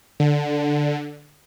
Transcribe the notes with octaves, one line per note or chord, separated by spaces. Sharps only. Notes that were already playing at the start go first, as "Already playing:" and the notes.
D3